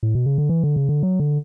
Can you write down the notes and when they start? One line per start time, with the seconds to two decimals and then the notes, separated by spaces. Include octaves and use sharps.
0.03 A2
0.15 B2
0.26 C#3
0.38 D3
0.49 E3
0.64 D3
0.76 C#3
0.89 D3
1.03 F#3
1.20 D3